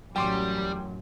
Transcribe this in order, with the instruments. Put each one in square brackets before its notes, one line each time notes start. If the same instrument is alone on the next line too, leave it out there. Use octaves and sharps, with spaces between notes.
[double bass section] A1 F#2 F#3 [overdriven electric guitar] G3 [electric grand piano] G5 C6 D6